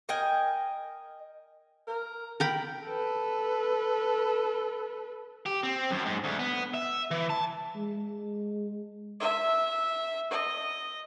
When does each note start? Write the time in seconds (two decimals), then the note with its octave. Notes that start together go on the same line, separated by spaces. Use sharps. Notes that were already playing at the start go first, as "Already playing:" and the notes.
0.09 A#4 D#5 G5 G#5
1.87 A#4
2.40 A#4 G5 B5
2.84 A4 B4
5.46 G4
5.64 C4
5.92 F#2
6.06 G#2
6.24 D2
6.39 B3
6.74 E5
7.11 E3
7.29 A5
7.75 G#3
9.20 E5
10.31 D#5